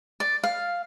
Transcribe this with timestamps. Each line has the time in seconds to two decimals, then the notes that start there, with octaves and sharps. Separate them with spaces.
0.20 D5
0.44 F5